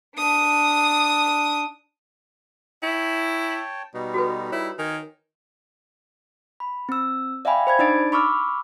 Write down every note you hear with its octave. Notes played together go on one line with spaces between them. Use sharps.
D4 D#6
E4 C#5 G5 A5
B2 G3 D#4
F#4 A4 B4
E4 C#5
D#3 G#5
B5
C4 E6
D5 E5 F5 G5 G#5 B5
C5 B5 G#6
D4 D#4 D5 A6 D7
B5 C#6 D6 E6 F6